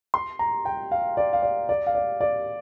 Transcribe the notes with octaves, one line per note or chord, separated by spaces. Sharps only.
C6
A#5
G5
F5
D5
F5
D5
D5
F5
D5
D5